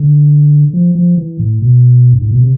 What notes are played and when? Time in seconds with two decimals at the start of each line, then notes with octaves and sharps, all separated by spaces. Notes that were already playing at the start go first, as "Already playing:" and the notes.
Already playing: D3
0.73 F3
0.95 F3
1.18 E3
1.39 A2
1.62 B2
2.13 G2
2.22 A2
2.31 B2
2.40 C3